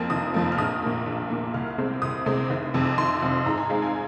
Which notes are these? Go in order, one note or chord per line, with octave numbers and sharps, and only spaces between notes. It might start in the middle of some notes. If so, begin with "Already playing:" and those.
Already playing: F2 F3 A#3
F1 D#6
F2 F3 A#3
F6
A#1 D#6
A#2 A#3
A#1
A#2 A#3
C2 F6
C3 G#3 C4
C2 D#6
C3 G#3 C4
F1
F2 C3
F1 C6
F2 C3
G#2 A#5
G#5
G#3 C4 F5
G#5